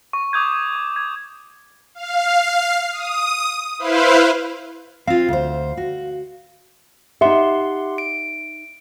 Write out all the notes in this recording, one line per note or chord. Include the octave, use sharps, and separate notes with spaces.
C#6
D6 D#6 G6 G#6
C#6
G#6
F5
D#6
E4 B4 C5 F5
C4 F4 F5
D2 C5
F#4
D#4 G4 E5 F#5 C6
D7